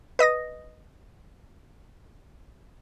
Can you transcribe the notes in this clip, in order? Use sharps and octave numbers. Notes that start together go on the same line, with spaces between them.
B4 D#5 D#6 A#6